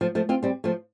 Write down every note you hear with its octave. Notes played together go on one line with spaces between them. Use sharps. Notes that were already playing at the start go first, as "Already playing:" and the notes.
F3 A3
F3 A3
C4 F4
G3 C4
F3 A3